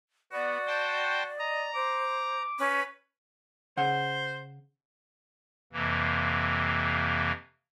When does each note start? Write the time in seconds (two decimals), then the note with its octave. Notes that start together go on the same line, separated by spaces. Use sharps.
0.33 B3 F#4 D5
0.67 C5 G5 A5
1.39 D#5 A#5
1.75 C5 D6
2.59 C#4 B4
3.77 C#3 C5 F#5
5.73 F2 C3 E3 A#3